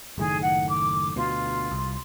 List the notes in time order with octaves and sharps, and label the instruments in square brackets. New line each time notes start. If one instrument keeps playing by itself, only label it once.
[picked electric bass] F#1 A2 D#3 [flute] G#4
[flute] F#5
D6
[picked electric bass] D2 B2 [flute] F4
[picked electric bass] C2